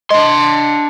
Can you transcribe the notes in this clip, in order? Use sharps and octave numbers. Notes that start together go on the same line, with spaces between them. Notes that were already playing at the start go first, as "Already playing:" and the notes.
D4 D#5 C6